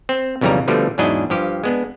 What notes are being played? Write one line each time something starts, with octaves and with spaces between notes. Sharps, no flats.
C4
B1 F2 C#3 E3 G3 A#5
B2 D3 F3 G3 A3
E2 G#2 F#3 D4 E4 D#5
G2 F3 G4
G#3 B3 D4